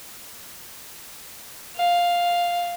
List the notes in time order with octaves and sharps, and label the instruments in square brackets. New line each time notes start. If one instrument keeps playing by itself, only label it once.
[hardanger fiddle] F5